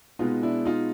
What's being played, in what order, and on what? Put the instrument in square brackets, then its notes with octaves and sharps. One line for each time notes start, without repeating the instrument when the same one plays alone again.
[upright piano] B2 G#3 B3 D#4 F4
D4 E4
D#4 F4